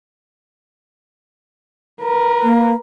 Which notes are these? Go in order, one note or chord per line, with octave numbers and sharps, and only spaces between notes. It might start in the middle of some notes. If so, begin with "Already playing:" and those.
A#4 B4
A#3